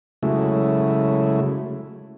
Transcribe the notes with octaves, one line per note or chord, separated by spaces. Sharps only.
C#3 F#3 G#3 A3 E4